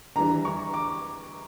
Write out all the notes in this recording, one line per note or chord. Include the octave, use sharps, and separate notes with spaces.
E3 G3 D4 A#5
C#6
D6